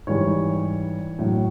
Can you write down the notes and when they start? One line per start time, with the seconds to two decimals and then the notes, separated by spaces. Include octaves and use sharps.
0.07 G#2 E3 G3 C#5
1.19 A2 F#3